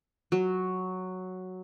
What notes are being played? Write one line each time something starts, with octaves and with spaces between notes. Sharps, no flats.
F#3